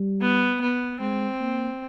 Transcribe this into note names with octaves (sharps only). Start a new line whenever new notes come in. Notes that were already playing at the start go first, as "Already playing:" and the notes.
Already playing: G3
B3
B3
G#3 C4
A#3